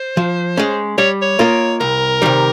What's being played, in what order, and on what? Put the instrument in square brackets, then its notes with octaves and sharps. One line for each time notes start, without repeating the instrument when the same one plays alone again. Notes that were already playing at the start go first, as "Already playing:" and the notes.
Already playing: [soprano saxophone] C5
[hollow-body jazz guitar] F3
G#3 C#4
[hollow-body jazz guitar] G3 [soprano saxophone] C#5
[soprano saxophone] C#5
[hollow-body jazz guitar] A#3 F4 A#4 D#5
[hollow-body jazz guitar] C2 [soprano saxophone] A#4
[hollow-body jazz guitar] C3 D#3 G3